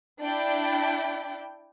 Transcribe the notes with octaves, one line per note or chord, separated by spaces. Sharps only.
D4 E4 D5 G5